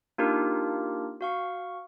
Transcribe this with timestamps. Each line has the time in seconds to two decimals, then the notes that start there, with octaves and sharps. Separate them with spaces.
0.18 A#3 D4 D#4 F4 G4 A#4
1.21 F#4 F5 C#6